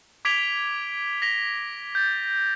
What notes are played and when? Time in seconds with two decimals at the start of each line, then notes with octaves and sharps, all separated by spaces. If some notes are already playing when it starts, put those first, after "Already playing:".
0.25 D6 G#6 B6 D7 F7 G7
1.22 A#6 B6 F7 G7
1.95 G6 A6